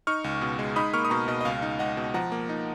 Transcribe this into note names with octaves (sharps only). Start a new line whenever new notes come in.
D#4 C#6 F6
C#2
B2
G#3
D#4 B5 D#6
A#3 C#6 F6
D#6
B2 A#5 C#6
B2 D#5
D#5
C#2 F5
D#4
C#2 D#5 F#5
B2
F3 F#5 A#5
A#3
D#4